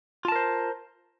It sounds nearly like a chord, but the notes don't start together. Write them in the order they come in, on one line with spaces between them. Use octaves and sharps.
F4 A5 A#4 C5